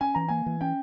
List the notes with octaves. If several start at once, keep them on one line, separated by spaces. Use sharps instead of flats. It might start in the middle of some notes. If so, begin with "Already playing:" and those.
C#4 G#5
E3 A#5
A#3 G#5
E3
C#4 G5